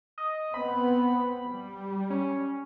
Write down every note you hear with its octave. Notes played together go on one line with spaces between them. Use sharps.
D#5
B3 C4 B5
G3
C#4